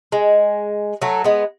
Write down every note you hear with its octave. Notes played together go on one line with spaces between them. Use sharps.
G#3
F#3 A3
G#3 B3